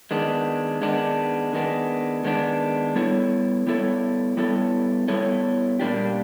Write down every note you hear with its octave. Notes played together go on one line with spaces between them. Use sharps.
D#3 G#3 B3 D4
D#3 G#3 B3 D4
D#3 G#3 B3 D4
D#3 G#3 B3 D4
G3 B3 E4 A4 C#5
G3 B3 E4 A4 C#5
G3 B3 E4 A4 C#5
G3 B3 E4 A4 C#5
A#2 G3 A#3 D4 G4